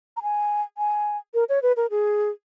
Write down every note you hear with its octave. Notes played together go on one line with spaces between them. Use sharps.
A#5
G#5
G#5
A#4
C#5
B4
A#4
G#4